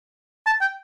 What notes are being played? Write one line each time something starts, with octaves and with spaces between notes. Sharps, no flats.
A5
G5